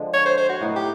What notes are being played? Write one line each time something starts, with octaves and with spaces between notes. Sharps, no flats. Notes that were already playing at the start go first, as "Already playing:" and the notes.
Already playing: D3 F3 G#3
C#5
C5
C5
F#4
A2 F#3 B3 D#4
G4